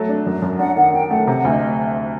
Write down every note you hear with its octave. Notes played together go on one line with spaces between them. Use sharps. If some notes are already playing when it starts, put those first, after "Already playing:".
Already playing: F#3 A3
D4
F#2
F#2
D4 F#5
D#3 F#5
D#3 G5
A3 F#5
C3 F#5
D2
D#5